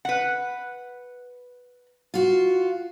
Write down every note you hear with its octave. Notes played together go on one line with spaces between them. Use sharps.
B4 F#5
F4 F#4